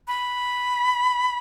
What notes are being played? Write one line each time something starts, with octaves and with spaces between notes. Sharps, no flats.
B5